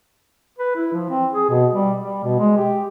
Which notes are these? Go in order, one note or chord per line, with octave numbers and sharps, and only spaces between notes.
B4
E4
F3
C4
G#4
B2
G3
G3
B2
G#3
G4